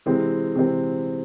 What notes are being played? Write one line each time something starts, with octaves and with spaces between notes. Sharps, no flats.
C3 E3 G#3 C4
C3 E3 G#3 C4